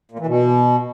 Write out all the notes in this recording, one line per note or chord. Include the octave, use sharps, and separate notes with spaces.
A#2
E3
B2